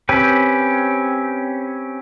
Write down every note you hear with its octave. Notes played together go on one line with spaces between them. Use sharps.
C4 C#4 G4 B4